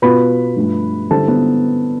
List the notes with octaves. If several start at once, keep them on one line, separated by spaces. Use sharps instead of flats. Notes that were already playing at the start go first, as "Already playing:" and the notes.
B2 B3 F4 B4 B5
G2 F3 A3
D3 G3 C4 E4 A4 A5
B3 B4